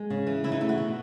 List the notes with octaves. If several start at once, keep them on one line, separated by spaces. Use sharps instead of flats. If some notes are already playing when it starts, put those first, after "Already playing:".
Already playing: G#3
C#3
E3
C#3 E4
D#4
A3 E4
F#4
B2